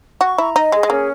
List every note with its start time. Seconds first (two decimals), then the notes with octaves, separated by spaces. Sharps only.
0.21 F#4 C#6
0.38 E4 A#5
0.56 D#4 D#5
0.72 G#3 G#4
0.83 G#3
0.90 A#3 C#4